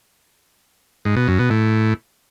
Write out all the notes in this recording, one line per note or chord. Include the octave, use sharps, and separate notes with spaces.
G#2
B2
F#2
B2
A2